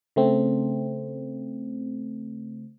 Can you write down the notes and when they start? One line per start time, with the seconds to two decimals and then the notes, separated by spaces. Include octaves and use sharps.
0.16 C#3 A3 C4